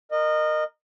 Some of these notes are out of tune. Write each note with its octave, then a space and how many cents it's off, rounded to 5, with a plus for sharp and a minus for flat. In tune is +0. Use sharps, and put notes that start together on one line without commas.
A#4 +0 D#5 -20